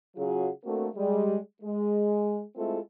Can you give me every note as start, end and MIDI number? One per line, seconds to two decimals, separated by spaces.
0.17 0.48 49
0.17 0.48 54
0.17 0.48 65
0.17 0.48 66
0.17 0.48 68
0.65 0.87 57
0.65 0.87 58
0.65 0.87 60
0.65 0.87 62
0.65 0.87 66
0.65 0.87 69
0.96 1.36 55
0.96 1.36 56
1.63 2.41 56
2.56 2.79 56
2.56 2.79 57
2.56 2.79 60
2.56 2.79 64
2.56 2.79 65
2.56 2.79 69